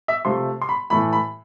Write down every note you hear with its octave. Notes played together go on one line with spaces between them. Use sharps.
E5
C3 F3 A3 C6
C6
B5
A2 E3 A3 B5
B5